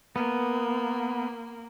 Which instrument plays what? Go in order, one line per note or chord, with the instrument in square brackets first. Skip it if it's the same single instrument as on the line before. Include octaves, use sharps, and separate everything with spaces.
[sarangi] A#3 [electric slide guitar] B3